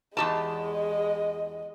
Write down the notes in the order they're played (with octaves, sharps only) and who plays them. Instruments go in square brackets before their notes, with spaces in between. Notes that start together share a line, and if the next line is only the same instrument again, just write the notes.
[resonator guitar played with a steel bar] E2 G4 A5 [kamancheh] G#3 D#5